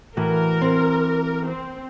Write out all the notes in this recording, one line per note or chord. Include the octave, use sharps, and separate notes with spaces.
A2 E3 F#4 A#4
C4
C4